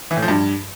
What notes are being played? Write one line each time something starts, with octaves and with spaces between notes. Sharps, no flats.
E3
A2
F3
G2